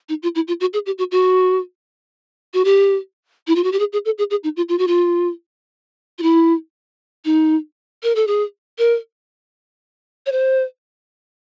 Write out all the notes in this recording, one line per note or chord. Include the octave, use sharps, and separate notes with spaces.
D#4
F4
E4
F4
F#4
G#4
G4
F#4
F#4
F#4
G4
E4
F4
F#4
G4
G#4
G#4
A4
G#4
G#4
D#4
F4
F4
F#4
F4
F4
E4
D#4
A#4
A4
G#4
A#4
C#5
C5